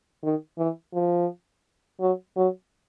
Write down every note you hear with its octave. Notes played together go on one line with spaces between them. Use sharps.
D#3
E3
F3
F#3
F#3